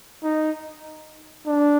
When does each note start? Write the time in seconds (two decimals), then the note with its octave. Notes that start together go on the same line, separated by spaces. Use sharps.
0.23 D#4
1.46 D4